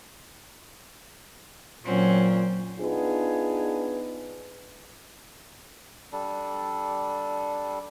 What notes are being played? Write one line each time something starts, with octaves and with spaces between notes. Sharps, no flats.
A#2 F#3 C4 C#4
B3 D4 D#4 F4 G#4
G3 D4 A4